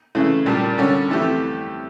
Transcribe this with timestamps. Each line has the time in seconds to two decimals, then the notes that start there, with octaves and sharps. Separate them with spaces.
0.15 C#3 E3 A3
0.46 A#2 G3 A#3 D4 G4
0.77 D3 G3 C#4
1.09 F2 E3 A3 E4 G4